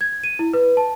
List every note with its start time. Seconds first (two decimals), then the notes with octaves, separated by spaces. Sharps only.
0.01 G#6
0.24 D#7
0.39 E4
0.54 B4
0.77 A5